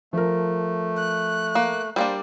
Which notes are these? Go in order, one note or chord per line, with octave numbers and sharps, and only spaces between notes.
F3 A3 A#4
F#6
A#3
G3 A#3 D4 C5